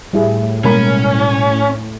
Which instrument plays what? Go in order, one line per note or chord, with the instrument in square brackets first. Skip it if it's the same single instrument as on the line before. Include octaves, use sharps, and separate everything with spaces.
[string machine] A2 [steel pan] G3 E4 G#4
[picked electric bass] B2 G3 G#3 [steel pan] A#3 A#4 B5 [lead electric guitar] C#4